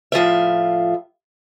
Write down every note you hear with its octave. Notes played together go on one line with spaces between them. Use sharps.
A2 F3 F4 E5